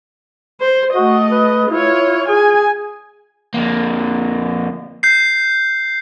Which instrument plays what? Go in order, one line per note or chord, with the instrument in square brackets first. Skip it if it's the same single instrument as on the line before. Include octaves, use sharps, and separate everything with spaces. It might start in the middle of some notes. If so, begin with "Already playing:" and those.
[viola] C5
[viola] A3 D#5 [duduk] F#4
[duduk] B4
[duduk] E4 [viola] F4 C#5
[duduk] G#4 [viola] G#5
[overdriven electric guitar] F2 A#3
[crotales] G6 C7